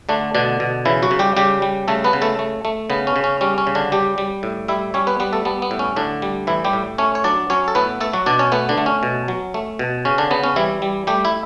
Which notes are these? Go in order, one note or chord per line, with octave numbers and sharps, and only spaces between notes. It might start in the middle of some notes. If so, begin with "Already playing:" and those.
D3 A3 D4
B2 D3 D4
B2
C#3 E3 E4
F#3 F#4
C#3
G3 G4
C#3 G3 G4
G3
C#3 A3 A4
B3 B4
C#3
A3 A4
A3
A3
C#3 B3
C#4
C#3
C#4
G3 C#4
C#4
C#3
D3 D4
G3 G4
G3
A2
G3 E4 E5
G3 C#4 C#5
B3 B4
G3 B3 B4
A3 A4
G3 B3
B3
A2
C#4
A2 D3 D4
G3
A2 E3 E4
G3 G4
A2
A3 C#4 C#5
C#5
F#3 D4 D5
F#3 C#4 C#5
A4
A2 B3 B4
A3 A4
F#3 F#4
B2 D4 D5
C#4 C#5
A3 B3 B4
D3 D4
A3
C#4
B2
F#3
A3
B2
C#3 C#4
D3 D4
C#3 B3
C#4
E3 G3 E4
G3
G3 A3 G4
E4 E5